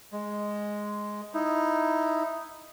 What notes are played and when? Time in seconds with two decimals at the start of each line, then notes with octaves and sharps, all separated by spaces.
0.12 G#3
1.34 D#4 E4